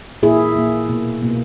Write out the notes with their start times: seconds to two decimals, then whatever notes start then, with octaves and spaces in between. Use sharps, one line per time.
0.22 A#2 A#3 E4 G#4
0.56 A#2 A#3
0.89 B2 A#3
1.23 B2 A#3